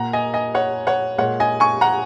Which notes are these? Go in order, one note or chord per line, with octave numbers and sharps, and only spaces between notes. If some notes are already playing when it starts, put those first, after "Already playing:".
Already playing: A#2 A#3 F#5 A#5
D#5 G#5
D#5 G#5
C#5 F#5
C#5 F#5
A#2 G#3 C#5 F#5
D#5 G#5
G#5 C#6
F#5 A#5